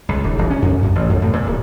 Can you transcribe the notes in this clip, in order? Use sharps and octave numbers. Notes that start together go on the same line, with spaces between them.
C#2
D#1
D#1
C#4
F2
F#2
A1
F2
A2
A#2
D1